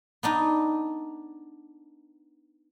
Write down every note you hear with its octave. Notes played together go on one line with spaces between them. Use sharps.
B3 D4 D#4